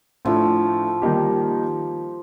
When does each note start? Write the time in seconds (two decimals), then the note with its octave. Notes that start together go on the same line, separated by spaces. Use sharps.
0.25 A2 F3 A3 D4 F4
1.02 D#3 G3 A#3 D#4 G4